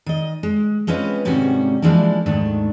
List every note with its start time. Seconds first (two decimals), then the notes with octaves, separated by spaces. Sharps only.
0.06 D#3 D#5
0.43 G#3
0.87 G#3 C4 C#4 F4 B4 D#5
1.25 G#2 C3 D#3 G3 C#4 F#4
1.82 E3 F3 G#3 A#3 D4
2.26 D#2 G#2 D#3 A3 D4